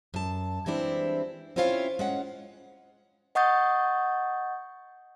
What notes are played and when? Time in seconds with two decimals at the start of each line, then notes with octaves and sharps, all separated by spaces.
0.14 F#2 A5
0.66 E3 G3 G#3 C4 D4 E4
1.56 C4 C#4 E4 F4 C#5 F5
1.99 G#3 C#4 F#5
3.35 D#5 F#5 C#6 D#6 G6 A6